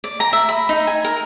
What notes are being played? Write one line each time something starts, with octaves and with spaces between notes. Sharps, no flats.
D5
A#5
E5
B5
D#4
G#5
A#4